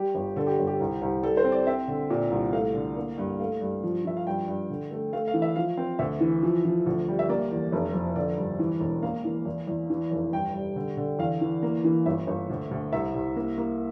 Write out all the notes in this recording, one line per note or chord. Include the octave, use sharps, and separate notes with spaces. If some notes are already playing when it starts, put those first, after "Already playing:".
Already playing: G3 G4
G1
D3 A4
G4
G1
G4
C2
C2
G3 A4
C5
C4
D5
C4 E5
D3
A#2
C2
A3 F5
D3
A#3
G2
A3 F5
G2
F3
F3 E5
F5
G2 G5
G2
D3
A3
A3 F5
F5
E3
E5
F3 F5
C4
D2 E5
E3
F3
F3
D2
G3
E5
A#3 D5
E2
F1
F2
D3 D5
G2
E3
E1
A#3 F5
E3
E2
E2
E3
F1
G2 G5
G3
D3
D3
E2 F5
E3
A#3
E3
G1 E5
G1
D2
D2
C2 E5
C2
A#3
A#3